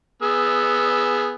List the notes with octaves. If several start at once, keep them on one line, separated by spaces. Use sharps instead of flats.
B3 G#4 E6